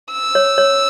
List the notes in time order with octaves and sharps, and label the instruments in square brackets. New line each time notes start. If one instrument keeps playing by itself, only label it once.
[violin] E6
[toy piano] C#5
C#5